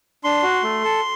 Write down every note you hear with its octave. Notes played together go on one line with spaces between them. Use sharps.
D4 C6
F#4
A3
A4